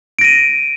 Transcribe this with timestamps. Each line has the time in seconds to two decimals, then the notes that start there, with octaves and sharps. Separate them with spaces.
0.19 D7
0.21 A#6
0.24 D#7